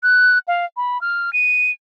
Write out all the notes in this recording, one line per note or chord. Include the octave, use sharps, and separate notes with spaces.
F#6
F5
B5
F6
D#7